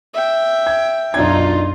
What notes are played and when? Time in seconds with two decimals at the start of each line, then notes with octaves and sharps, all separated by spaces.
0.14 E5 G5
0.66 G#6
1.14 B1 F#2 D4 D#4 F4 G#6